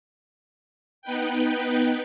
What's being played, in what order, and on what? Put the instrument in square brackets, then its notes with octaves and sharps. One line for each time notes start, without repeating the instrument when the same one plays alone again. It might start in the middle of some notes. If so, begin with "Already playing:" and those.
[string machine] B3 D#4 B4 G5